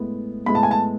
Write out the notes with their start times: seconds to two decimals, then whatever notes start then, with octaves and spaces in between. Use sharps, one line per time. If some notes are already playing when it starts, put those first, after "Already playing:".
Already playing: A2 G#3 B3
0.46 A2 G#3 B3 B5
0.55 A5
0.63 G#5
0.71 A5